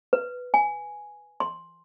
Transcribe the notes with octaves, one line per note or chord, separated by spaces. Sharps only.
B4
G#5
C6